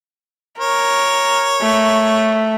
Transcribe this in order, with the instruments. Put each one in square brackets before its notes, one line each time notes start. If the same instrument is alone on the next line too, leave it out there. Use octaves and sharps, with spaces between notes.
[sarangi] A#4 [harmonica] C#5
[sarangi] A3